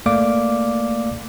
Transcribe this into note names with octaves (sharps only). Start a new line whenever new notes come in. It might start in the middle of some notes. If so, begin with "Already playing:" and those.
A3 A#3 D5 F5 D6